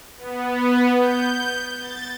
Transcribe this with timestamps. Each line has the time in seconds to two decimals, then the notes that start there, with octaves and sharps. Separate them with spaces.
0.18 B3
0.96 G6
1.80 A6